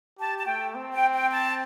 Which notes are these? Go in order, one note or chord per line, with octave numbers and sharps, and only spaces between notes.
G4 A5
A5
A3 G5
C4
G5
G5
A5